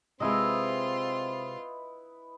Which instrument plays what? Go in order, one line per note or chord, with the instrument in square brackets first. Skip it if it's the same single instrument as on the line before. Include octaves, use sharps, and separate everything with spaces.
[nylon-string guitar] C3 G#3 [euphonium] C4 [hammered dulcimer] E4 B4 D#5 [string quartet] F4 C6